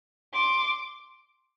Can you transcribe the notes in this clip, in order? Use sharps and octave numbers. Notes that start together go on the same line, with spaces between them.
C6 D6